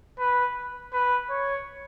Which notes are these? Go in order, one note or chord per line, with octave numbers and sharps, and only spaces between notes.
B4
B4
C#5